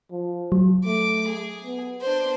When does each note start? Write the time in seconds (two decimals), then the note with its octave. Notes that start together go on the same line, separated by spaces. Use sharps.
0.11 F3
0.52 F#3
0.85 A3 D6
1.28 G#4
1.64 B3
2.01 D4 C5